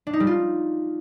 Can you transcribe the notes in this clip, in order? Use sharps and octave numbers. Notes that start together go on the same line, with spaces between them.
D4
D#4
G3
F4